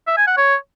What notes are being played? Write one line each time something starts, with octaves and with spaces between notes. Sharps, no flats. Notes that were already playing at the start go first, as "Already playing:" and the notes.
E5
G#5
F#5
C#5